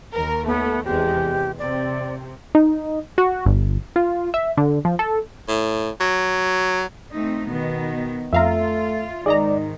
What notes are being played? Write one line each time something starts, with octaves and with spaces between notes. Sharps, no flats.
D#2 A#4
A3 B3
E2 C3 G#3 G4
C3 C4 D5
D#4
F#4
G1
F4
E5
D3
F3
A4
A2
F#3
A3 C4 D#4
B2 D#3 B3
F2 A3 F4 E5 F5 A#5
G#2 D#3 D#4 G#4 D5 D#5 A#5